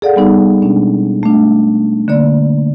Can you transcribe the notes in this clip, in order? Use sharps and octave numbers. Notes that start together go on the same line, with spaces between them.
G#4 A4 D5 F5 F#5
G3 B3 D#4
B2 G#3 C#4 D4
A3 D4
D3 A#3 D5